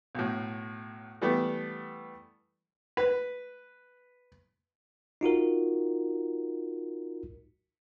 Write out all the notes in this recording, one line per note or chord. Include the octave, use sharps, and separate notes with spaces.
B1 A2
E3 G3 A3 B3
B4
D#4 F4 F#4 A#4